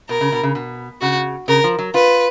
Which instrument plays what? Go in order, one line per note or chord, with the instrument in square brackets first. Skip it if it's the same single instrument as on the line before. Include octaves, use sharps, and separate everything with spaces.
[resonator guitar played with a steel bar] B2 [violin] A#4
[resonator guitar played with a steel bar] C#3
B2
C#3
B2
[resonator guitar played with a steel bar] C#3 [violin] F#4
[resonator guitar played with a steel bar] C#3 [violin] A#4
[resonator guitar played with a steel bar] F3
F#3
[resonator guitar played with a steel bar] F4 [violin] B4